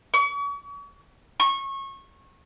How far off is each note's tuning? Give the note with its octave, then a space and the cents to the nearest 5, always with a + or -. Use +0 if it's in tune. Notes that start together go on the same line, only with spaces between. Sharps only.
C#6 +40
C#6 -25